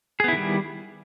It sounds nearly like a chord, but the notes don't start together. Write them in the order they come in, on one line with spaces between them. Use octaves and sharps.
G#4 B3 E4 D#3 G3